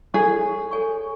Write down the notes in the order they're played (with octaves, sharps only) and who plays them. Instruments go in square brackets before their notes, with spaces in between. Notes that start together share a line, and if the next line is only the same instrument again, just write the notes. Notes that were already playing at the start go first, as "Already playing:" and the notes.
[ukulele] G#4 [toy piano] A4 C#5 G#5 C#6
[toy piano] A4 C#5 G#5 C#6